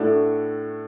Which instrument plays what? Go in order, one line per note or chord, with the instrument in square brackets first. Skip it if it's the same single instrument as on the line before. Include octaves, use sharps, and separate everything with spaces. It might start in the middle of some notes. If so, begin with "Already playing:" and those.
Already playing: [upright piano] A2 A3 D4 F#4